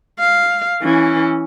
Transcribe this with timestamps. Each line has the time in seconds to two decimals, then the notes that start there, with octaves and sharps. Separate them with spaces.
0.20 F5
0.82 E3 C#4